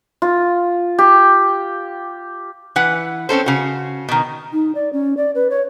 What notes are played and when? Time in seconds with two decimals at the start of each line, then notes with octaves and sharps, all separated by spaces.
0.22 F4
0.99 G4
2.76 E3 B4 F#5
3.29 C4 C#4 A4 C5
3.46 C#3 F#4
4.09 B2 D#3
4.53 D#4
4.75 D5
4.93 C#4
5.17 D5
5.35 B4
5.50 C#5